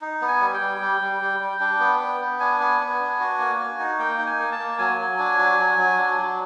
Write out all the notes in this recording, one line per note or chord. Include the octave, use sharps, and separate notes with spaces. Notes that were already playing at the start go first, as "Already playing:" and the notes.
D#4
B3
G#5
G3
G5
G3
G3
G3
G3
G3
D4
B3
B3
B3
D4 G#5
B3
B3
D4
F#4
A#3
F#4
D#4
A#3 G5
D#4
G#5
A#3
A5
A#3
F#3 G#5
F#3
D4
F#3
F#3
F#3
D4
F#3